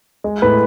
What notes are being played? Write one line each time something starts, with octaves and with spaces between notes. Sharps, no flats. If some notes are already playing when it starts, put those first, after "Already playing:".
G#3
A2 B4